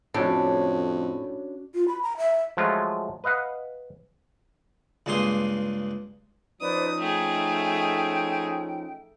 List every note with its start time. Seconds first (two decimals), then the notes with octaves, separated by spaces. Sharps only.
0.14 F2 A2 C#4 D4 F#4
1.74 F4
1.88 B5
2.03 A#5
2.18 E5
2.57 F3 F#3 G#3 A3 F4
3.24 B4 D#5 F5 F#5
5.06 C#2 G2 A#3 G#4 C6 D#6
6.61 F3 C#4 D#4 B4 C5 D5 D#6
7.00 A3 G#4 G5